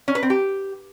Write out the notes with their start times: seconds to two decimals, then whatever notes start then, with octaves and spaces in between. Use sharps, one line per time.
0.08 C#4
0.15 B4
0.23 C4
0.30 G4